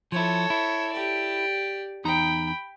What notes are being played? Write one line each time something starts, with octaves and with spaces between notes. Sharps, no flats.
F3 E4 A4 C#5
E4
G4 D5
E2 D#4 G5 A#5 B5